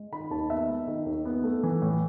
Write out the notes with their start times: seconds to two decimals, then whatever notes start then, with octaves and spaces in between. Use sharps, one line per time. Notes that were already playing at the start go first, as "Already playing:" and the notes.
Already playing: G#3
0.12 D#3 B5
0.30 D#2 A5
0.50 B3 E5
0.69 G#3
0.87 D#3
1.06 D#2
1.25 B3
1.43 A3
1.63 E3
1.82 A2